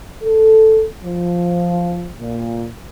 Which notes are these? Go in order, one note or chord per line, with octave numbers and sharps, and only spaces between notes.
A4
F3
A#2